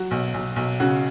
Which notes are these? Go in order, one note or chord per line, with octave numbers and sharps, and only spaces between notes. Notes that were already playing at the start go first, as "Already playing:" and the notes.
Already playing: F#3 F#4
B1
B1
B1
C#3 F#4